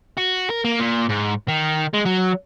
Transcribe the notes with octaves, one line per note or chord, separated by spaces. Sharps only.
F#4
A#4
A#3
A#2
G#2
D#3
G#3
F#3